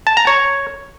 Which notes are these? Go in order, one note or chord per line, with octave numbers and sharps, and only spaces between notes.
A5
A#5
C#5